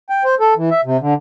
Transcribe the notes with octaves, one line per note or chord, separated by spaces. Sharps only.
G5
C5
A4
E3
E5
C3
D3